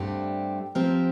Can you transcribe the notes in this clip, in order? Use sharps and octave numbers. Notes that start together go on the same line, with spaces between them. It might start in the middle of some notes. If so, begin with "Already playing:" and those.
Already playing: G2 D3 A3 C4 G4
F3 C4 G4 A#4